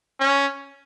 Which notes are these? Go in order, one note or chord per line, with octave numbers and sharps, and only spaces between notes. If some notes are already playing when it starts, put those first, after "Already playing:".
C#4